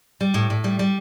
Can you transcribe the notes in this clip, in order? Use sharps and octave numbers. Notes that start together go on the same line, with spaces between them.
G3
A2
A2
G3
G3